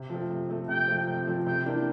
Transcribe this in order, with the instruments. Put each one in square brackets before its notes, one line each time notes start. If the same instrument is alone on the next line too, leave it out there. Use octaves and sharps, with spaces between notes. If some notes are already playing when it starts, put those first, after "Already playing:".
Already playing: [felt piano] C3
F3 A3 C4
C3
F3 A3 C4
[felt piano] C3 [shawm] G5
[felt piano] F3 A3 C4
C3
F3 A3 C4
[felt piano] C3 [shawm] G5
[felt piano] E3 A#3 D4